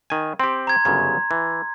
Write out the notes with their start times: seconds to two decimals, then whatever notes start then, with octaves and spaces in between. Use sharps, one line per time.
0.10 D#3 G#5
0.40 C4 G4 C6
0.67 A#5 G#6
0.85 G1 F#2 C#3
1.31 E3